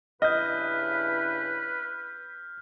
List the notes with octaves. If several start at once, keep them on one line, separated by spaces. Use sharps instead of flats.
G2 C#3 E4 B4 D#5 F6 G6